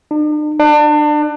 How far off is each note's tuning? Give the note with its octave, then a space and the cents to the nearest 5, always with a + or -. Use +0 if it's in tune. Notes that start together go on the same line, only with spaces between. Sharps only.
D4 +45
D4 +30